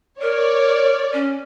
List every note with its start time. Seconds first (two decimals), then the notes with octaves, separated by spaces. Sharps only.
0.22 A#4 C#5 D5
1.14 C#4